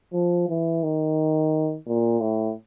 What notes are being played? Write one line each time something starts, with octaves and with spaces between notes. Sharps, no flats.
F3
E3
D#3
A#2
A2